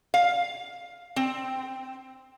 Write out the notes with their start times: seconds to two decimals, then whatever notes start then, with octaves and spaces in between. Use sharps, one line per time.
0.14 F5
1.16 C4